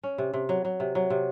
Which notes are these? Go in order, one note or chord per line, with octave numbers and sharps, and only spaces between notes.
C#4
C3
C3
F#3
F#3
C3
F#3
C3